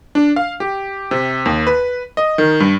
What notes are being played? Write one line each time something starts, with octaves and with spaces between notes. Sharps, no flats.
D4
F5
G4
C3
D#2
B4
D#5
D#3
G2